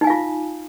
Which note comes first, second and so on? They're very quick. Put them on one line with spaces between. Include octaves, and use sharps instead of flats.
D#4 G#5 F5 F4